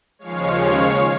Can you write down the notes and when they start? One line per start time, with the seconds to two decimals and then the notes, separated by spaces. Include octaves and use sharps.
0.19 D#2 C#3 F3 G#3 C#5 F5
0.55 C#5 F5